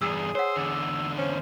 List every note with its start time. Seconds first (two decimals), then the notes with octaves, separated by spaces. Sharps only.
0.02 E2 G2 G#4 E6
0.35 C5 C#5 F#5 E6
0.56 E2 D3
1.18 C#4 C5